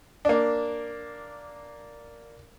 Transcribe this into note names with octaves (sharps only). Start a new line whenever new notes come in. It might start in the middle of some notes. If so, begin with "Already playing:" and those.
A#3 D4